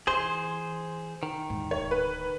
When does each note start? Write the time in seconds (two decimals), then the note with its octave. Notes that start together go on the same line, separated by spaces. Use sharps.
0.07 E3 G#4 C5 C6
1.23 D#3
1.50 E2 G#2
1.71 D1 D3 C#5
1.91 B4